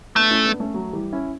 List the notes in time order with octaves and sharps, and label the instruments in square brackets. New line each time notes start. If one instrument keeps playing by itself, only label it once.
[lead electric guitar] A3 [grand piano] B3 D4
[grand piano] C#4 E4
B3 D4
A3 C#4
F#3 A3
E3 G3
C#4 E4